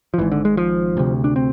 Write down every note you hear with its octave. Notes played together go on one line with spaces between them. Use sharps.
F3
G#1 G#2 E3
D3
G#3
F3
D2 C3
D4
C4